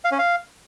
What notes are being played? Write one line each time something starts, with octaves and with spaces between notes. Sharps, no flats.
F5
C#4
F5